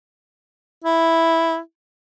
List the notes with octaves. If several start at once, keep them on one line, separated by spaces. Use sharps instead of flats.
E4